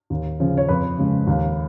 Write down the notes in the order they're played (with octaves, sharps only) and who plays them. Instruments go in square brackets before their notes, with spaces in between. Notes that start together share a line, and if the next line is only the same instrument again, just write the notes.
[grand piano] D#2
C#3 F3
C#5
F2 B4
C#3 G#3
D#2